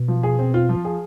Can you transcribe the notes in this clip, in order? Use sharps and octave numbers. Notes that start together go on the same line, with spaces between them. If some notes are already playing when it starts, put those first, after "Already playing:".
Already playing: B2
F3
G#4
C4
F4
F3
G#4